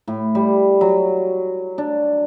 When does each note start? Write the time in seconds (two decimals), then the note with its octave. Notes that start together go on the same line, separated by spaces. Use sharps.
0.08 A2
0.35 G3
0.81 F#3
1.78 D4